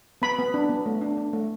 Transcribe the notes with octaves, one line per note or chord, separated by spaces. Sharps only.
B3 B5
B3
D4
B3
A3
D4
D4
A3